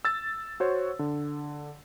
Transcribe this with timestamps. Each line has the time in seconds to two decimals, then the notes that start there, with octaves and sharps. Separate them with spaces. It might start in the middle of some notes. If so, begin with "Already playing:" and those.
0.05 E6 A6
0.60 F#4 C5 C#5
0.99 D3